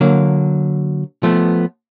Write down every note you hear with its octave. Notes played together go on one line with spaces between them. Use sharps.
D3 F#3 A#3
F3 A3 B3